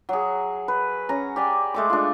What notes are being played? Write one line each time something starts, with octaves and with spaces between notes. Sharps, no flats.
F#3 G#4
B4
C#4 A#5
G4 D5 G#5
G#3 A3 D6
D4 F4